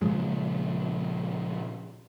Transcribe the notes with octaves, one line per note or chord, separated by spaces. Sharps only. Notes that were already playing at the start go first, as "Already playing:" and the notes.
A#2 C#3 F3 G#3